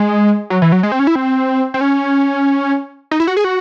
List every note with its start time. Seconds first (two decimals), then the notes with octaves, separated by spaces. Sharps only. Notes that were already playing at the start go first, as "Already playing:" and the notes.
Already playing: G#3
0.50 F#3
0.62 E3
0.72 F#3
0.83 G#3
0.92 C4
0.99 C#4
1.07 E4
1.15 C4
1.74 C4
1.81 C#4
3.11 D#4
3.20 E4
3.27 F#4
3.37 G#4
3.44 F#4